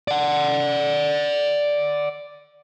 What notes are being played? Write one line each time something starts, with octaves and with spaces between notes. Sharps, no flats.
D5 F#5